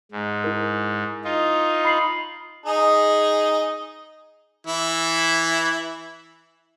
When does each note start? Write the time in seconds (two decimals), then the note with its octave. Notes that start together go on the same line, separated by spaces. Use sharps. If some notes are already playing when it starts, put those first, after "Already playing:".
0.12 G#2
0.44 E4 A#4
1.24 D#4 F4
1.85 B5 C7 F#7
2.66 D#4 G#4 D#5
4.67 E3 E4